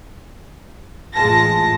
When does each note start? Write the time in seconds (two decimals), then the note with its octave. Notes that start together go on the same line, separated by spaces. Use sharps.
1.15 A1 G#3 F4 A5 A#6